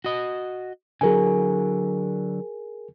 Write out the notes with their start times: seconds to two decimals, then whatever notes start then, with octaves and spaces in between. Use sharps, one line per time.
0.04 F#4 D#5
1.01 D3 F#3 G#4 A#4 G#5